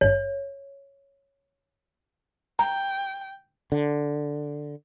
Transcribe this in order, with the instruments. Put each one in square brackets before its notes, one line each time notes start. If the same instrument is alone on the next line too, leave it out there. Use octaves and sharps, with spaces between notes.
[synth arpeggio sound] G#1 G2 [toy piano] C#5
[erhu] G5 [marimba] A#5
[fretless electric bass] D3